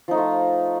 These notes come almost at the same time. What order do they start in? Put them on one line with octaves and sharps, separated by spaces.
F3 D#4 A3 F4